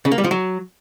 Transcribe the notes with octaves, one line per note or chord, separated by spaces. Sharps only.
C#3
A#3
G3
F3
F#3